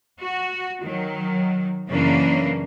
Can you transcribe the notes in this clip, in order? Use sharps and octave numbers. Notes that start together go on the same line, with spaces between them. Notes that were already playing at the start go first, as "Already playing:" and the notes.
F#4
D#3 F#3
F#2 C#3 E3 A#3 C#4 D4